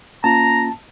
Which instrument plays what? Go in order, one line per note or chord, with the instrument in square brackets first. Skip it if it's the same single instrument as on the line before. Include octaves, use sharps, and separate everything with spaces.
[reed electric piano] A#3 C#4 F4 [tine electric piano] A5 [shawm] A#5